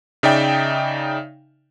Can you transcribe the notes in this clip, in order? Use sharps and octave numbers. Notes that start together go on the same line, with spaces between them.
C#3 D#4 D5 E5 G5